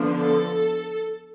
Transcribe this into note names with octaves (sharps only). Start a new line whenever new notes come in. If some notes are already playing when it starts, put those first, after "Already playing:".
Already playing: D3 F3 B3 D4
A4